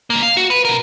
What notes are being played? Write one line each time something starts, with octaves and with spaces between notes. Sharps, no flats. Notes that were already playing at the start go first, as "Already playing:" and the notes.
C2 A#3
F5
F#4
B4
B2 A#4